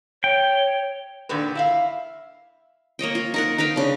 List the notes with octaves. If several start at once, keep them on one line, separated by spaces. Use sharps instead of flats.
C#5 G5
A#2 D3 D#3 G4 B4
E4 E5 F5
A#3 C#5 D#5 G5
F4
D#4 A#4 F#5
D#4 B4 F5 G5
C#3 D4